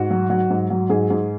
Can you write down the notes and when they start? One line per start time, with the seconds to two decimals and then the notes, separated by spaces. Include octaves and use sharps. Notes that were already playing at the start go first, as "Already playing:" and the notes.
Already playing: G#2 F#4
0.11 F#3
0.30 F#3
0.50 G#2
0.70 F#3
0.90 G#2 G#4
1.10 G#2